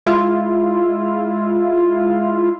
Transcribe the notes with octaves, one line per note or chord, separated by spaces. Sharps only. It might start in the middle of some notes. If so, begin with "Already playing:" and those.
G#3 E4 F4